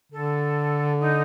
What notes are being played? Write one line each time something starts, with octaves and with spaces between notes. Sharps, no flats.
D3 A4
D#4